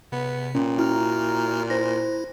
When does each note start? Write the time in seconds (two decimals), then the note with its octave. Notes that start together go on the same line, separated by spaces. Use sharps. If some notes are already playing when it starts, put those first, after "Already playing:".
0.12 C3 B3
0.55 A#2 C#4
0.78 E4 F#4 A#5 F6
1.70 E4 C5 A#6